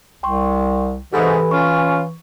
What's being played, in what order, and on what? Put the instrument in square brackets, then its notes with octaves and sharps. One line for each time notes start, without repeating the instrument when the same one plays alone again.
[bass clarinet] C2 [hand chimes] G5 C6 C#6
[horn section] G#2 C3 [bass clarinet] E3 [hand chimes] G4 A4 B5
[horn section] C#4 F4 [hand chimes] C#6